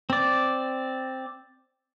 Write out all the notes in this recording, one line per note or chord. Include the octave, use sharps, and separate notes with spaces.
C4 D5